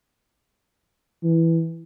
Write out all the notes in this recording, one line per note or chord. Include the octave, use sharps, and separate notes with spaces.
E3